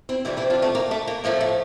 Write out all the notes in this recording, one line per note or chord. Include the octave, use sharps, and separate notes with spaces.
C4 E4
F2 C3 E3 G3 C4 E4
C4 E4
D4 F4
A3 C4
A#3
A3
A#3
A2 F3 A3 A#3
A3